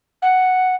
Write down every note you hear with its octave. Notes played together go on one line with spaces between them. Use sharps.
F#5